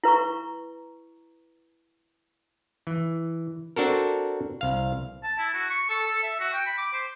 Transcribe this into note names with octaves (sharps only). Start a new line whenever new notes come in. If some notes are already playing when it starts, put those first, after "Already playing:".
E4 B4 A#5 C#6
E3
C4 D4 F#4 A4 A#4
C2 F5
A5
E4
F#4
C#6
A4
A4
E5
F#4
G5
B5
D6
C5